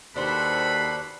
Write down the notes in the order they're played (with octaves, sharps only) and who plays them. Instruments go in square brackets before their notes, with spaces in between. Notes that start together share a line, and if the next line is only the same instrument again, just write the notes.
[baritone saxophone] D#2 [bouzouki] D4 C5 [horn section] F#4 A4 B5 [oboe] B4